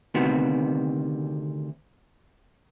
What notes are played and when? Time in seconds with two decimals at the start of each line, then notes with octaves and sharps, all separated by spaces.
0.14 D2 C3 D#3 B3 C4 F#4